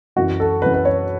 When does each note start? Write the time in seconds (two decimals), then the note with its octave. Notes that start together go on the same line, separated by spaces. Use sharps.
0.16 F#2 E3 F#4
0.40 A4
0.62 E3 B4
0.66 F#2
0.74 B4
0.85 C#5